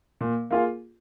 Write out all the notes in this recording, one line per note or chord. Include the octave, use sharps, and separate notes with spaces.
A#2
A#3 F4 G#4